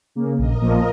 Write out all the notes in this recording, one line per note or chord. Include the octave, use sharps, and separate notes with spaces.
C#3 A#3
A#1 A#4 D#5
A#2 F3 A#3